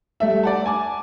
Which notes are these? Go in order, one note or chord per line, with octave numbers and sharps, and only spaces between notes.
G3 A3 E5
D5 F#5 A5
G#5 A5 D6